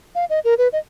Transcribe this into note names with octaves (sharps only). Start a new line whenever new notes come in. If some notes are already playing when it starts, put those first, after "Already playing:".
F5
D#5
A#4
B4
D#5